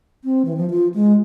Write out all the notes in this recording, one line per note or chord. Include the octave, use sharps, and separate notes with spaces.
C4
E3
F3
F4
G#3